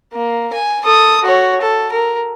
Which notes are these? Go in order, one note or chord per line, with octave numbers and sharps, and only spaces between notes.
A#3
G#5
A4 D#6
F#4 C#5
A4
A#4